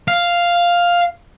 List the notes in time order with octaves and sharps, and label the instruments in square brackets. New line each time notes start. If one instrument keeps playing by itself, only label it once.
[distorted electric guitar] F5